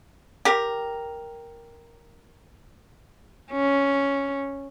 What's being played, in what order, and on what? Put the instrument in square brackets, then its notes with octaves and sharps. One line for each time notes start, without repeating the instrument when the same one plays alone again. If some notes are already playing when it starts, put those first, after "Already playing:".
[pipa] G4 A#4
[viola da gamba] C#4